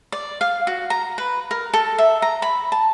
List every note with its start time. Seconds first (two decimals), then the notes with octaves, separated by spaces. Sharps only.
0.12 D5
0.41 F5
0.67 F#4
0.90 A#5
1.18 B4
1.51 A#4
1.74 A4
1.98 E5
2.22 A#5
2.42 B5
2.72 A5